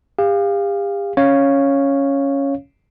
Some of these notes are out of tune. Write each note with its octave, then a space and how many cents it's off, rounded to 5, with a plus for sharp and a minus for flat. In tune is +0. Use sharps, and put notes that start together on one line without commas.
G4 +40 F5 +0
C#4 +0 C#5 +0 F5 +0